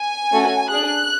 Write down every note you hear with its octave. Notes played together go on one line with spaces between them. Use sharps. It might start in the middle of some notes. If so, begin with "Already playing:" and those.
Already playing: G#5
A3 C#4 F#4 A4
D4 G#4 F#6